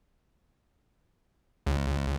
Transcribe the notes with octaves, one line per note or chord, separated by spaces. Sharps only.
C#2